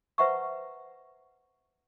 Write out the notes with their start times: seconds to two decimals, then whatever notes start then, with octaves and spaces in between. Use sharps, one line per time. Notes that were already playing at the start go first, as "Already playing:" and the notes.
0.18 B4 C5 E5 F#5 A#5 C#6